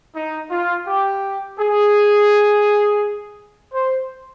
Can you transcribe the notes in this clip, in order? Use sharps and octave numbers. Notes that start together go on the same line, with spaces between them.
D#4
F4
G4
G#4
C5